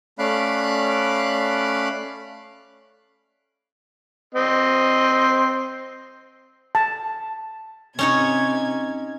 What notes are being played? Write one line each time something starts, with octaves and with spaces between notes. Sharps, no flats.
A3 C#4 D5 F5 B5 F#6
C4 D#5
A5
C3 C#4 D#4 C#5 G#6